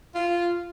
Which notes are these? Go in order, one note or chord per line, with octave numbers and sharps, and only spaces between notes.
F4